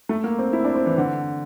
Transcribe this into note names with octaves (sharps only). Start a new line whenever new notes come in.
A3
A#3
C4
E4
D4
C4
E3
D3